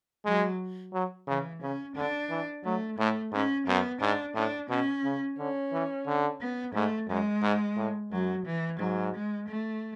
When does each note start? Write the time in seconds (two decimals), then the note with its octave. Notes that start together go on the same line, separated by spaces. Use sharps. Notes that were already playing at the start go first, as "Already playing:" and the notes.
0.25 F#3 G#3
0.93 F#3
1.27 C#3 E3
1.61 C#3 C#4
1.96 D3 D4
2.30 E3
2.64 F#3 A3
2.98 A2 A3
3.32 G#2 C#4
3.67 F#2 B3
4.01 G#2 D4
4.35 A2 D4
4.69 B2 C#4
5.04 C#3
5.37 D3 C#4
5.73 E3
6.06 D3
6.40 B3
6.74 G#2 A3
7.08 F#2 G#3
7.42 G#2
7.77 A2
8.11 F#2 F#3
8.45 E3
8.79 G#2 F#3
9.15 G#3
9.48 A3